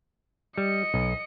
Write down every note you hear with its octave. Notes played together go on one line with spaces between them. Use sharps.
G3 D#5 C#7
B1